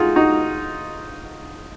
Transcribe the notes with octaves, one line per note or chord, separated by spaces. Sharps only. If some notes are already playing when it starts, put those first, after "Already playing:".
Already playing: D#4 F4 F#4 G#4
D#4 F#4